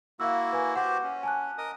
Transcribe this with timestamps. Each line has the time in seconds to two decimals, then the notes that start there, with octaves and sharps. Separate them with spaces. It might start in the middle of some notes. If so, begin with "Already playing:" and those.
0.20 A#3 E4 F#4 F5 E6
0.53 B4 G#5
0.76 F#4 G4 C5 F#5
1.03 C#4
1.23 G#5 A5 F#6
1.58 A#4 D#5 D#6